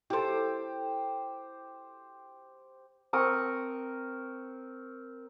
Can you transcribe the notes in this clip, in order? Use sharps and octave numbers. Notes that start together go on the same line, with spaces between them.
E4 G4 A4 C5
C4 A#4 C#6 D#6